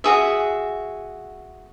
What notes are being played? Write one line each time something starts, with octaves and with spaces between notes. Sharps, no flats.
F#4 G#4 E5